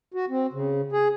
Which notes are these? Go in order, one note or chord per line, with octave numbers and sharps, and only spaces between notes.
F#4
C4
C#3
G#4